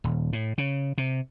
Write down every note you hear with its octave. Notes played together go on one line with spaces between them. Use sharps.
D#1
A2
C#3
C3